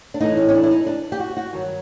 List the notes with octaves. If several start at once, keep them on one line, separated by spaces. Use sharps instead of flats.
D4
A2 E3 D#4
C#4
C#4
D4
E4
D#4
D4
G4
F#4
F#4
G2 D#3 F#3